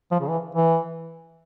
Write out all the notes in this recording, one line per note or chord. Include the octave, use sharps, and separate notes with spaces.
F3
C#3
E3
E3